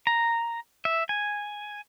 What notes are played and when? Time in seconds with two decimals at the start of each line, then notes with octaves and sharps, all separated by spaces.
0.07 A#5
0.85 E5
1.09 G#5